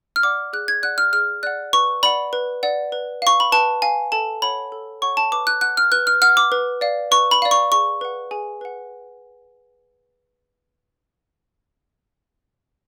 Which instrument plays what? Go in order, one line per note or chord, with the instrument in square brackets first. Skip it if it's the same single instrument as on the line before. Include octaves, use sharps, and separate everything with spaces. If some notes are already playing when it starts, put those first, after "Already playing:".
[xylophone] F6
D5 F#5 D6
G#4 F#6
G#6
D5 F#5 F#6
F6
G#4 F6
D5 F#5 F#6
B4 C#6
D5 F#5 B5
B4
D5 F#5
B4
F5 C#6
B5
B4 A5
F5 G#5
A4 A5
C#5 F#5 B5
A4
C#5 F#5 C#6
A5
B4 D6
F#6
F#5 F#6
F6
B4 F#6
F6
F#5 F6
D6
B4
D5 F5
B4 C#6
B5
D5 F5
C#6
G#4 C#6
B4 F#5
G#4 G#5
B4 F#5